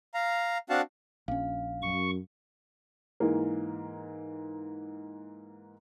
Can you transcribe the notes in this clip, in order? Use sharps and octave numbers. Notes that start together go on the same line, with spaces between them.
F5 A#5
C4 D4 F#4 F5 F#5 A5
A#1 C#4 F5
F#2 C#6
G#2 E3 A#3